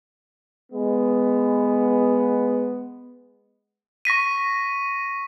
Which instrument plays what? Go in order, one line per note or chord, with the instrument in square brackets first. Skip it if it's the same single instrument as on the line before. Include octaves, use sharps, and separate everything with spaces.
[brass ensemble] G#3 B3
[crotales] C#6 A#6 B6 D#7